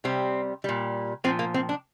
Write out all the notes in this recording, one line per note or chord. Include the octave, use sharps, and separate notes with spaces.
C3 G3 C4
A#2 G3
A#2 F3 C4
A#3
C4
D4